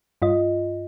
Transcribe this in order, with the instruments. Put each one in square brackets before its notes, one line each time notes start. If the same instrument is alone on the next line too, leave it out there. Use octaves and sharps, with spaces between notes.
[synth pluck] G2 F4 D#5